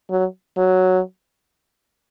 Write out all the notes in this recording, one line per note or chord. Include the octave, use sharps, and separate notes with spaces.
F#3
F#3